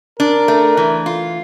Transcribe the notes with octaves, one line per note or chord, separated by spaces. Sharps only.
D4 A#4
A3
E3
F4